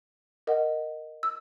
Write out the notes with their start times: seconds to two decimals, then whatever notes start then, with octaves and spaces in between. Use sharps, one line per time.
0.47 A#4 D#5 F#5
1.23 E6